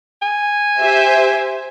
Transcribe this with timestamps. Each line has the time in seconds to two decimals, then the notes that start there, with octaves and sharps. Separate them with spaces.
0.22 G#5
0.79 G4 C5 E5